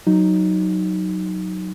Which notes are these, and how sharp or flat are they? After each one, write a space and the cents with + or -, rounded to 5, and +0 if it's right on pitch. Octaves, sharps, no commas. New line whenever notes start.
F#3 +0 D#4 +0